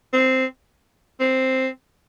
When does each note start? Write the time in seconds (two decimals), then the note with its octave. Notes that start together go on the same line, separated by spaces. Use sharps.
0.13 C4
1.20 C4